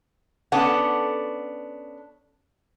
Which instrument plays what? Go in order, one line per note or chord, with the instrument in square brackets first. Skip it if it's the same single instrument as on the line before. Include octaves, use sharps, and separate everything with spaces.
[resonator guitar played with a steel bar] B3 C#4 D4 A4 F#5